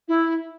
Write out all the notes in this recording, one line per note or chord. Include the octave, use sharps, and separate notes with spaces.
E4